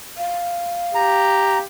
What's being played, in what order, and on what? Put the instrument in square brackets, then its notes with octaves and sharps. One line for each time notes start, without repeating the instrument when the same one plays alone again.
[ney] F5
[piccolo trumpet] G4 [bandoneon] A#5